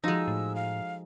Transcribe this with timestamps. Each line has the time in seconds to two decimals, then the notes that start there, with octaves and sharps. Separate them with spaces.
0.04 F3 G#3 D#4 F#4 A4 E6
0.28 A2
0.55 F5